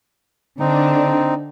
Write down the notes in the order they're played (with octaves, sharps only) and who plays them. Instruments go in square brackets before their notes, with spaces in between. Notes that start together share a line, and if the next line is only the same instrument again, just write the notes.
[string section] D3 D4 [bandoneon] C4 D#4